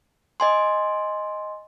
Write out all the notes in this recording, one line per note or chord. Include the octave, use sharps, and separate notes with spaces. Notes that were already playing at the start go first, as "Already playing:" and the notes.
D#5 G#5 C6